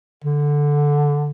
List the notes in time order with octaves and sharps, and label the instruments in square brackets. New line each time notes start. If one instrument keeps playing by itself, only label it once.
[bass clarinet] D3